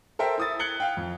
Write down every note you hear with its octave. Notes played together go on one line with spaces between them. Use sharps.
A4 A#4 C5 E5 G5
E4 D#6 A6
F#6 G#6 C#7 F#7 G7
F5 G5
F2